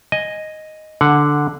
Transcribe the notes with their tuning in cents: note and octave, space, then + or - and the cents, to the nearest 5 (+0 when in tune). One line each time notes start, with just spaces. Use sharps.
D#5 +0 G#5 +0
D3 +0 F#5 +0